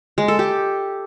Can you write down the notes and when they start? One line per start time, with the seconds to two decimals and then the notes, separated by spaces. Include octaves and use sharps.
0.18 G#3
0.28 A4
0.39 G4